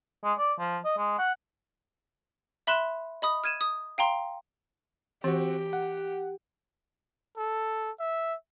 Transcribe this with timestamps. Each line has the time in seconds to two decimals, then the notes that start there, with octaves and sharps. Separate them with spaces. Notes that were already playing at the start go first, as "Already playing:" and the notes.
0.24 G#3
0.39 D5
0.59 F3
0.85 D#5
0.98 G#3
1.18 F#5
2.67 E5 B5 C6 F#6 E7
3.22 D#5 B5 D#6
3.44 F6 G#6 D#7 E7
3.61 D#6
3.98 F5 G5 A#5 C6
5.24 E3 C4 F#4 G4
5.73 F#5
7.37 A4
8.00 E5